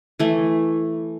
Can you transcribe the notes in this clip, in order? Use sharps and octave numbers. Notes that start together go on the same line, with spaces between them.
E3 A3